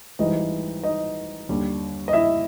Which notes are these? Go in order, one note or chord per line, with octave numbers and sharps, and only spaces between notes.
G#1 G#2 E3 G3 D#4 D#5
D#4 D#5
D#2 D3 G3
D#5
E4 E5